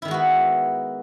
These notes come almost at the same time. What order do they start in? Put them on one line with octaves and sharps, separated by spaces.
E4 D#3 G#3 F#4 B3